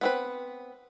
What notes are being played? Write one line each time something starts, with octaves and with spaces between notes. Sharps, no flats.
B3 C4 B4